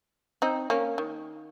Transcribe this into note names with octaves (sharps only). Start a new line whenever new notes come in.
C4 D#4
A#3 C#4
D#3